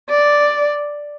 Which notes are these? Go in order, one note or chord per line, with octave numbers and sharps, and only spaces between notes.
D5